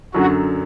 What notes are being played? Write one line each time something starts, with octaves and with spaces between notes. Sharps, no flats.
F#2 D3 F#3 F#4